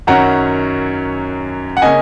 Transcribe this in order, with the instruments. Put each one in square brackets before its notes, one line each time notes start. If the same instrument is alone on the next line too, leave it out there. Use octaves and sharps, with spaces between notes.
[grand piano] F#2 D#3 F#3 C#4 F#5 A#5
F#5
C#3 A#3 C#4 D#5 G#5